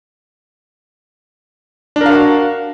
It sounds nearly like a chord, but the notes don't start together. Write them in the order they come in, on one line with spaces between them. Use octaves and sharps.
D4 A#4 F5 F#4